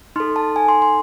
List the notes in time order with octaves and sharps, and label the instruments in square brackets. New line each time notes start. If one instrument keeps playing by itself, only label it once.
[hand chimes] D#4 A4 C6
A5
G#5
C6
C6